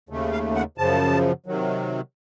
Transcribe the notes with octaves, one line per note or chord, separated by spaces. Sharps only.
D#2 C#3 A3
F5
F#5
F#2 C#3 F3 A5
C3 D#3 F#3